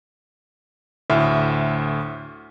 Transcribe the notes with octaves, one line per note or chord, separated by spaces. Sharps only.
D2 A2 E5 F6